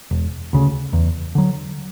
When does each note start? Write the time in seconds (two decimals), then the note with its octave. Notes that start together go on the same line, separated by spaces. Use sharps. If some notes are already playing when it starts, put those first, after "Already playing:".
0.11 E1
0.53 D2 C#3
0.93 E2
1.35 D3 F#3